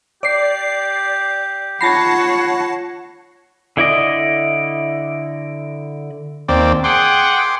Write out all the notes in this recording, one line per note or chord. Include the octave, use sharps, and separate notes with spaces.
G4 D5 C7
F4 C#5 F#5 A5 B5 A#6 C7
D3 E4 D5 D#5
D#2 C4 D5
G#4 F#5 G5 C6 D6